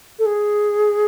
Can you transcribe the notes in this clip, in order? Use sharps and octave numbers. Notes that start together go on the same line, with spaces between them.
A4
G#4